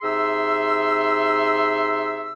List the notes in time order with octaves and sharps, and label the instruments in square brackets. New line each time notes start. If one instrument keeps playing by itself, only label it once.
[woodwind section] C3 D#4 G#4 E5 C6 E6